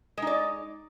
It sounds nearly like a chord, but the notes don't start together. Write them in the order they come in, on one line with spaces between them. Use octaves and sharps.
G#3 D#4 D5